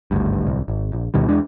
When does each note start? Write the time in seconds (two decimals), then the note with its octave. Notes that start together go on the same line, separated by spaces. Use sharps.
0.11 G#1 D2 G2
0.46 D1 C2
0.68 G#1
0.93 A#1
1.14 D2 B2 D#3 G3
1.28 E2 G#3 D4